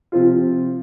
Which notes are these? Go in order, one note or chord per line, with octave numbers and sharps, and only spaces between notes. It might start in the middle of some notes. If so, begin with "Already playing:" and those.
C3 F3 C4 F4